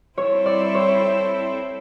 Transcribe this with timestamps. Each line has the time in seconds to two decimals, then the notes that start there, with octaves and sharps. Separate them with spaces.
0.17 G3 C4 E4 A4 C5 C#5
0.46 D5
0.75 C#5